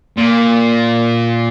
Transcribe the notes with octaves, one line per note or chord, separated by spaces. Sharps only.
A#2